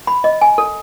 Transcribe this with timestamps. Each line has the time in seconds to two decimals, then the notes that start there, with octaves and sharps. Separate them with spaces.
0.07 B5
0.24 D#5
0.41 G#5
0.58 A4